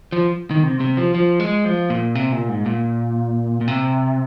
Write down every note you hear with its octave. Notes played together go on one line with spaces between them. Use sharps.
F3
D#3
C3
C3
F3
F3
G#3
F3
A#2
C3
A#2
G#2
A#2
A#2
C3